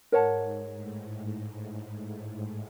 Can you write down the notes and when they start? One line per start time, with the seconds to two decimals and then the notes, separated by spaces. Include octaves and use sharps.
0.12 G#2 A#4 C#5 F#5 A5
0.74 A2
1.04 G#2